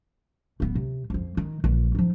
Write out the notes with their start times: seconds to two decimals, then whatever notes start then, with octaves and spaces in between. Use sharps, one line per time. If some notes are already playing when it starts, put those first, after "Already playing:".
0.60 D1 B3
0.75 C3
1.10 F2 F3
1.37 D#3
1.64 A#1 E3
1.95 F3 D#4